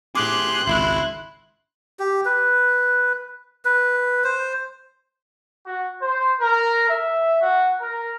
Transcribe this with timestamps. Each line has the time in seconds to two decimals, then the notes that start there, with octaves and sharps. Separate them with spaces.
0.15 A2 G4 G#4 C6 D6 F#6
0.67 G#1 C#2 E4
1.99 G4
2.25 B4
3.65 B4
4.24 C5
5.65 F#4
6.01 C5
6.41 A#4
6.89 E5
7.42 F#4
7.81 A#4